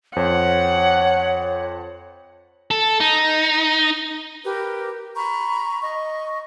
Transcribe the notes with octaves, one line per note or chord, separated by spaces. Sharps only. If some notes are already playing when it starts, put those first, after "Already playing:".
F2 C5 C#5 F#5
A4
D#4
G4 A#4 B4
A#5 B5 C#6
D#5 C#6